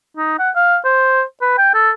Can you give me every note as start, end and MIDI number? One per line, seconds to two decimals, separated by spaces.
0.17 0.34 63
0.39 0.50 78
0.55 0.77 77
0.85 1.22 72
1.41 1.54 71
1.58 1.74 79
1.74 1.91 69